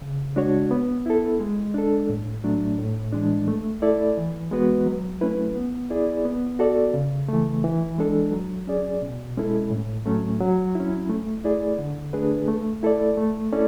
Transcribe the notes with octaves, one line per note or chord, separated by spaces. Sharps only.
C#3
G#3 D4 F#4 C#5
B3
E4 A4
G#3
D4 A4
A2
F#3 A3 D4
A2
E3 G#3 D4
A3
E4 A4 D5
E3
G#3 B3 F#4 B4
F#3
A3 C#4 E4 B4
B3
E4 G#4 D5
B3
F#4 A4 D5
C#3
E3 A3
E3
G#3 D4 A4
F#3
C#4 G#4 D5
B2
G#3 C#4 E4 A4
A2
F#3 A3 C#4
F#3
C#4 E4
A3
E4 G#4 D5
D3
A3 D4 G#4 B4
A3
E4 A4 D5
A3
C#4 E4 A4 D5